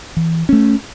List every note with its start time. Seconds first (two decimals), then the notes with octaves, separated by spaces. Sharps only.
0.17 E3
0.49 A3 C#4